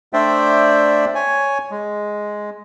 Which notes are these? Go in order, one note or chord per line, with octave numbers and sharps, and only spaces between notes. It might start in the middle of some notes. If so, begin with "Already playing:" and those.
A3 D4 C5 D5 E5 G5
C#5 G#5
G#3